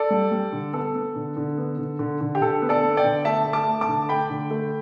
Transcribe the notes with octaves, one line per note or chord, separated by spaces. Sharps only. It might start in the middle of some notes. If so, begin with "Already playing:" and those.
Already playing: A4 D5
G3
G3
D3
B3 A4
B3
D3
D3
B3
D3
D3
D3
G4
D3 A4
B3
A4 D5
B3
D5 G5
D3
A3 E5 A5
A3
A5 D6
A3
A5 D6
D3
A3 G5 B5
D3
A3